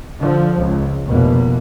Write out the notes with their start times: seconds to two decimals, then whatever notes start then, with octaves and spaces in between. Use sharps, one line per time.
0.21 D3 F3
0.57 C#2
1.08 F1 B2 A#3